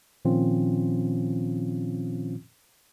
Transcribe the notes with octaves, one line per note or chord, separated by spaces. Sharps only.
A#2 D#3 F3 C4 C#4 F4